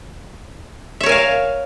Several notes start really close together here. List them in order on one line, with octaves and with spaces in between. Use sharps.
E5 C#5 A#4 G#5 F5